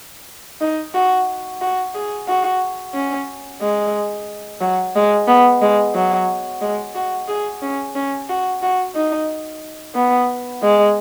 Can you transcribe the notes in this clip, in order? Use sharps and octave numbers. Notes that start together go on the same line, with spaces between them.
D#4
F#4
F#4
G#4
F#4
C#4
G#3
F#3
G#3
B3
G#3
F#3
G#3
F#4
G#4
C#4
C#4
F#4
F#4
D#4
B3
G#3